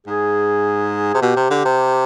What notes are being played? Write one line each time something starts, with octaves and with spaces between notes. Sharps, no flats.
G#2 G#4
C3
B2 G4
C3
D3
C3